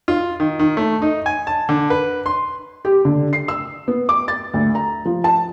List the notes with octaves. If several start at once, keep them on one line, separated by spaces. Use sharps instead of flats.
F4
D#3
D#3
A3
D#4
G#5
A5
D3
B4
C6
G4
D3
C7
E6
B3
D6
A6
D2
A#5
F3
A5